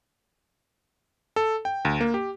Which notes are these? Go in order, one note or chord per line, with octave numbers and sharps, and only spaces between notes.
A4
G5
D2
A#3
G4